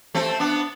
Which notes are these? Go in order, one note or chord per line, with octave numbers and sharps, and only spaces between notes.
A3 C4
B3 D4